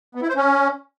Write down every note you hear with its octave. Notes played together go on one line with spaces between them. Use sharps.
B3
E4
C5
C#4